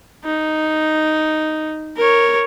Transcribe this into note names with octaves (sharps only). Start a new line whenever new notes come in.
D#4
A#4 C#5